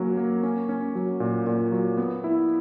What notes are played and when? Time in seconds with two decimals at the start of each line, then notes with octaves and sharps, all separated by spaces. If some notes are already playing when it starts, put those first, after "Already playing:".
Already playing: F#3 A#3 C#4
0.17 A#3
0.43 C#4
0.69 C#4
0.95 F#3
1.20 A#2
1.47 A#2
1.72 F#3
1.97 B3
2.24 E4